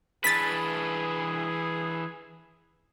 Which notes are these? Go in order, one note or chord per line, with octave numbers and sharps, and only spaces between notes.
E3 D4 G#4 B4 A6 B6